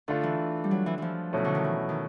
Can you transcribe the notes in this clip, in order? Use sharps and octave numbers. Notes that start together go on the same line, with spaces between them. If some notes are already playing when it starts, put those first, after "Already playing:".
D3 A3 D4 F4
E3
G3
F#3
E3
E3 F3
B2 F#3 A3 C#4 E4
D3
D#3
E3
D#3